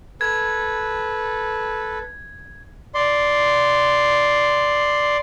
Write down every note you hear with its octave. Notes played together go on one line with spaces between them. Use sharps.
A4 B4 G#6
D5 C6